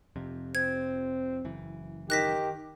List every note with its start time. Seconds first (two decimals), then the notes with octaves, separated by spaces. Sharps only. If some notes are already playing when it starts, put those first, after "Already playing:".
0.16 F1 F2 C3
0.55 C4 G#6
1.45 F#1 E3
2.10 D#3 G4 F#6 A#6 B6